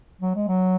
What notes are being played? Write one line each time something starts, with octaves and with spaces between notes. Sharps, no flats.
F#3
G#3
F#3